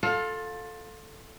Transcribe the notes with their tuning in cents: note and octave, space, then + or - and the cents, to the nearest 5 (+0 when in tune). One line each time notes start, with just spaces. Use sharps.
F4 +25 A4 +0 F5 +0